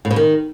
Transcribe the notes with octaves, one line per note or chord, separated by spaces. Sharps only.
A2
B2
D#3